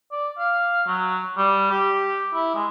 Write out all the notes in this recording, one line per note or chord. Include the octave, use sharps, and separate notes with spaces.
D5
F5
F#3
G3
G4
E4
G#3